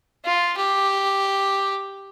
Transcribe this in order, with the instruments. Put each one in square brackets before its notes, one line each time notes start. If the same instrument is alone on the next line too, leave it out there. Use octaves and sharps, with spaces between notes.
[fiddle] F4
G4